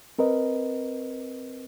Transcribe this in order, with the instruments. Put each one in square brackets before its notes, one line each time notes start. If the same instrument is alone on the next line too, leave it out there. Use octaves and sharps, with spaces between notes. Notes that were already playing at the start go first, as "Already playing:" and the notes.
[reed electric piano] C4 A#4 B4 D#5